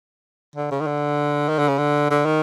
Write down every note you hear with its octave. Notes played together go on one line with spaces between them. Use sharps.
D3
C#3
D#3
D3
D#3
D3
C#3
D3
D3
D#3